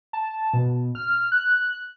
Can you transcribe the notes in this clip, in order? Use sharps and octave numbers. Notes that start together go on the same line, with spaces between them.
A5
B2
F6
F#6